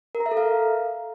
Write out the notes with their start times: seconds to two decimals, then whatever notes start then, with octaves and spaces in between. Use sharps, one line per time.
0.15 A#4
0.20 A#5
0.26 E5
0.31 A4
0.37 F5